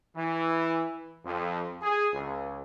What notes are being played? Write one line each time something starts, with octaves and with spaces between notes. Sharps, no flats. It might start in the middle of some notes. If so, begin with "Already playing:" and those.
E3
F2
G#4
C#2